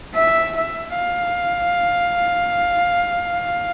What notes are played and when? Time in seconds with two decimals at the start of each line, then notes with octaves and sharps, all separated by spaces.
0.15 E5
0.56 E5
0.97 F5